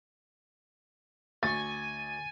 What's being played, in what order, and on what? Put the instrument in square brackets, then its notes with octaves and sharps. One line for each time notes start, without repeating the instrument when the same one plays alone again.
[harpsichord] D2 C#6 [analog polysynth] G#5 [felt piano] A6